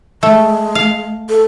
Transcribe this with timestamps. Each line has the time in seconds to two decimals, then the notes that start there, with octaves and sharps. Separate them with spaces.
0.23 G#3 A3
0.75 F5
1.29 A4